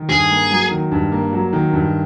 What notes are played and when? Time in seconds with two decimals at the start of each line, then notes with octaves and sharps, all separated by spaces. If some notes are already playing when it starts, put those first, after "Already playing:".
Already playing: D#3
0.09 G2 G#4
0.31 A#3
0.51 F#3
0.71 D#3
0.91 G2
1.12 A#3
1.33 F#3
1.53 D#3
1.73 G2